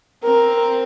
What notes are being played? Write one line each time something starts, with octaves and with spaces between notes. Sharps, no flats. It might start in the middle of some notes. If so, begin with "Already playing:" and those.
C4 A#4